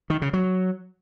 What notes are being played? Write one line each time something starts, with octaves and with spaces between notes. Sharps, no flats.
D#3
C#3
F#3